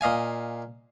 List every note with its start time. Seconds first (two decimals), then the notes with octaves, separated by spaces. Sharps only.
0.01 A#2 D#5 F5 G#5